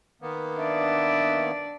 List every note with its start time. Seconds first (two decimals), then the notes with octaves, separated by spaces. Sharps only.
0.22 D#3 A#3 B3
0.59 D4 D5 E5